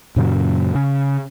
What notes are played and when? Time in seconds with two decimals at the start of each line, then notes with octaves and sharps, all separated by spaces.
0.16 F#2 A#2 C#3 F#3
0.75 C#3